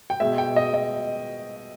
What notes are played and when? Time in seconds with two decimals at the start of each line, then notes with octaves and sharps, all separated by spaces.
0.10 G5
0.20 B2 G#3 E5
0.38 G5
0.56 D#5
0.74 D#5